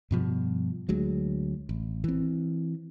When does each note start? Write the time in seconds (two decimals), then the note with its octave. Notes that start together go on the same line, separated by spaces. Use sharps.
0.11 G2 B2 F3 G3
0.89 D2 F#3 G#3
1.69 A1
2.04 E3 C4